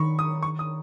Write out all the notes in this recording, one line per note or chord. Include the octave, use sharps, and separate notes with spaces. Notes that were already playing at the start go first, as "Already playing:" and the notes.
Already playing: D#3 B5 C#6
D#6
C#6
D#6